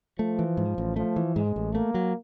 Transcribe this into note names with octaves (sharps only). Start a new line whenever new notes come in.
F3 A3
E3
G#2
A1
F3 A3
E3
G#2 G#3
A1
A3 A#3
F#3